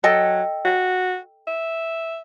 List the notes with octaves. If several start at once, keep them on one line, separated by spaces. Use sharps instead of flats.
F#3 A4 D#5 G5
F#4
E5